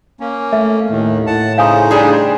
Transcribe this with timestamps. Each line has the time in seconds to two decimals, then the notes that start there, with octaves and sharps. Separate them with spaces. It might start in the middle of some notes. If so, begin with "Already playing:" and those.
0.20 A#3 C#4
0.53 A3 E5
0.90 D#2 A2 D#3
1.27 A2 F#5 A5
1.58 C#3 D#4 C5 F5 G#5 D#6
1.91 G3 D4 G#4